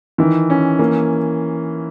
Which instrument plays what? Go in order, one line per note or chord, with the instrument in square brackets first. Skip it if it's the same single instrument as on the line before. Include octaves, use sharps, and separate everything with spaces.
[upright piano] D#3 [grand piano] E3
[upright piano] C#4
A#3